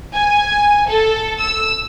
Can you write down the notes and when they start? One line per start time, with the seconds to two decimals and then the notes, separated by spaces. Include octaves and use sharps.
0.14 G#5
0.88 A4
1.40 E6